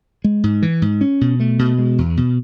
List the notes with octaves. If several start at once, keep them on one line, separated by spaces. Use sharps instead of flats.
G#3
G#2
E3
G#2
C#4
B2
A3
B2
G#3
E2
B2